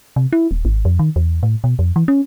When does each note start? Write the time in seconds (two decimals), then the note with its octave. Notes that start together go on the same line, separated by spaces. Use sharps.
0.16 C3
0.33 E4
0.51 D#1
0.65 G#1
0.85 F2
0.99 D#3
1.16 E2
1.43 A2
1.64 B2
1.79 F2
1.96 E3
2.08 C#4